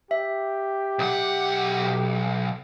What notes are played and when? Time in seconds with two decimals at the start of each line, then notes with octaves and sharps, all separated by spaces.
0.11 G4 E5
0.99 B1 F#5